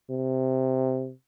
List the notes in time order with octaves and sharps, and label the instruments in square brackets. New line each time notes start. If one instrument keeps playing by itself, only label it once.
[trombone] C3